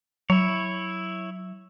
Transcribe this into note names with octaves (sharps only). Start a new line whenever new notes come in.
F#3 E4 C#5